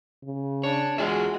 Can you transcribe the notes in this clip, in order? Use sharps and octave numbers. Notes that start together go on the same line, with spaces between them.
C#3
D4 C#5
E2 G#3 F4 F#4 G#4 E5